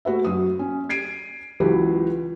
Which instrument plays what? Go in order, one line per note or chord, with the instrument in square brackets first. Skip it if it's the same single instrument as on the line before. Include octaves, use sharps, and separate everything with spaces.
[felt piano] A3 F#4 B4 E5
F#2 F#3 D#6
C#4
G#6 C7 D7 D#7
C#2 E3 F#3 F#4 G4 B4